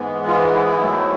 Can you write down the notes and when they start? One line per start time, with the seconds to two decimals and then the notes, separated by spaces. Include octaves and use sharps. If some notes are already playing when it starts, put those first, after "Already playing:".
Already playing: G#2 E3 G#3 B3
0.27 F4
0.53 E4
0.66 E4
0.79 G#2 D#3 F#3 A3